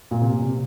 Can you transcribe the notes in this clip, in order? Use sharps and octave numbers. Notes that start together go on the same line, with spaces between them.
A#2
C3
A#2
C3